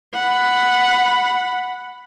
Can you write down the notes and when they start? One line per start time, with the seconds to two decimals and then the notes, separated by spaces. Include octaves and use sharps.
0.14 F#5 B5